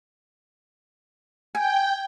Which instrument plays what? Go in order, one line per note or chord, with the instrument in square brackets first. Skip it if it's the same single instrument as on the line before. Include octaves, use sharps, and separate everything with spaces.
[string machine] G5 [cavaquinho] G#5